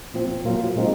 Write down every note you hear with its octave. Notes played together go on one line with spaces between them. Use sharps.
A#2 F3 C4
A#2 F#3 A#3 F4
A#2 F3 G#3 C4 D#4